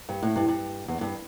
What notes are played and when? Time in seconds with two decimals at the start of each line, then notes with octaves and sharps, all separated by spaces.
0.09 G2
0.22 A2
0.36 G2
0.48 G2
0.88 E2
1.01 G2